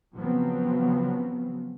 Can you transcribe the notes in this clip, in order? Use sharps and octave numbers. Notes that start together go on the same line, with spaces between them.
C#3 F3 F#3 B3 C4